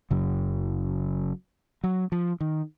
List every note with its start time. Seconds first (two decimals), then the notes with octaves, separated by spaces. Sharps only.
0.11 F#1 F#2 C#3 F#3
1.84 F#3
2.12 F3
2.41 D#3